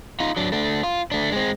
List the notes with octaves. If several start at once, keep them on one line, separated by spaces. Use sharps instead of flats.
D#4 F4
F#3 D4
A3 D4
F4
A3 D4
G#3 C4